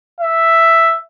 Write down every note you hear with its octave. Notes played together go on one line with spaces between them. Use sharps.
E5